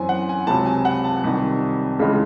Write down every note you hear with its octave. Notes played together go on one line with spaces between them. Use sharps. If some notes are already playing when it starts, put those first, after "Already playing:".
Already playing: F#2 E3 C4 G#5
F#5
G#5
C#2 C3 F#3 A5
G#5
F#5
A5
C2 C3 D#3
C#2 C#3 E3 G#3